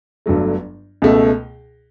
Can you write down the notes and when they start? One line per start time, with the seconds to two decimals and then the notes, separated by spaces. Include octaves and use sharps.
0.26 G1 G2 F#3 A3
1.02 C#2 B2 A3